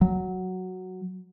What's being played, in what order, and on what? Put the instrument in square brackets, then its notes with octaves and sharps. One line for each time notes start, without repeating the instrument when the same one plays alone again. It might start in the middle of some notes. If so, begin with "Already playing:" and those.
[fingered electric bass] F#3